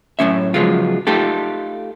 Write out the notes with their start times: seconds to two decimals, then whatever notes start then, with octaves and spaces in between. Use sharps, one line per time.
0.19 F#2 A2 D#3 C#4 E5
0.54 C#3 F3 F#3 G#3 B3 F4
1.07 A3 D#4 F4 G4 A4